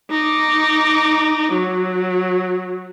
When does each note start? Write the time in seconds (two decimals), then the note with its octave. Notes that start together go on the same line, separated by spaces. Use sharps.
0.11 D#4 D6
1.53 F#3